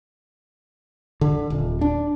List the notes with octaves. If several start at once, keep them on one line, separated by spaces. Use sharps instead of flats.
D3
D#1
D4